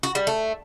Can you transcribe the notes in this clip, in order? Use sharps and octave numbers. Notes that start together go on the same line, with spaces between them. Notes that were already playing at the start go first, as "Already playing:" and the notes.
F#4
G3
A3